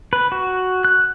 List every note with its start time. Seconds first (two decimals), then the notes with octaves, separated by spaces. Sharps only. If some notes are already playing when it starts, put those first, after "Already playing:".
0.13 B4
0.32 F#4
0.85 F#6